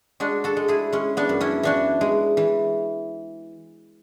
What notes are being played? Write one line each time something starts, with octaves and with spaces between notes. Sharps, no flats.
G#3 D4 F#4
F#4 A4
G#3
E4 G#4
G#3 C#4
B3 D4
F#2
C#4 E4
E3 D4 F#4
G#3
E3